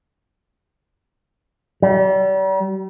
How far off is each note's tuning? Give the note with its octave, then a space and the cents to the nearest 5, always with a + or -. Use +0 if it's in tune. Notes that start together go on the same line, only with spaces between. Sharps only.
G3 -40